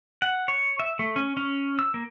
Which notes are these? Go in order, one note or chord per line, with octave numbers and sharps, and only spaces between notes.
F#5
C#5
E5
A3
C#4
C#4
E6
A#3